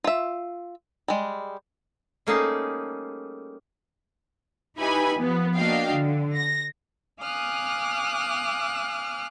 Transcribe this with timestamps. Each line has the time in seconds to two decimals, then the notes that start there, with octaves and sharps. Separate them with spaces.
0.04 F4 E5
1.08 G3 G#3
2.27 G3 A3 A#3 C#4 D#4 G#4
4.79 D#4 E4 G4 B4 G#5 B5
5.18 F3 B3
5.55 A#3 D4 F#4 D#5 F5 G5
5.93 D3
6.35 A#6
7.21 F5 G#5 D6 D#6 F6 F#6